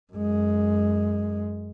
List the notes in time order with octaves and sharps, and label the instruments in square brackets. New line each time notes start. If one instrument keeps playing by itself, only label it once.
[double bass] F#2 G#3